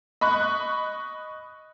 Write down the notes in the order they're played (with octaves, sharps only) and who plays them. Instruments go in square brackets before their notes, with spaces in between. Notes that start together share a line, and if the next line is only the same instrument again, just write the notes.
[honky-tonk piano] D#5 B5 C#6 F#6